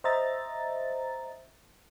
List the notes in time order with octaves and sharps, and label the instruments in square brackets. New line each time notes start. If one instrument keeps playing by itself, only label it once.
[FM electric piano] C5 D#5 E5 A#5 A6